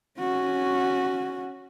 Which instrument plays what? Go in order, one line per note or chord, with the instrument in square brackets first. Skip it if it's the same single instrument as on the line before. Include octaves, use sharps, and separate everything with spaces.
[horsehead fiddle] C#4 F#4